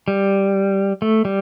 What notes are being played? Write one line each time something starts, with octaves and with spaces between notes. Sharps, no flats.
G3
A3
G3